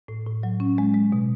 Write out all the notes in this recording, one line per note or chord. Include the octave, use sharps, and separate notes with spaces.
A2
A2
F#3
C#4
G#3
G#3
B2